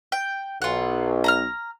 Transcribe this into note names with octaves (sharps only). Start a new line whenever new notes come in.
G5
B1 F4 F#5
A#5 B5 F6